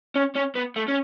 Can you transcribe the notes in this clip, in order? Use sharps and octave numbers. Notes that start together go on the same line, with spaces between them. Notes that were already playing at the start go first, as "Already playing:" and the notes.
C#4
C#4
B3
A3
C#4